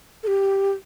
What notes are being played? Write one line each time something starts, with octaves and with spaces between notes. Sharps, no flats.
A4
G4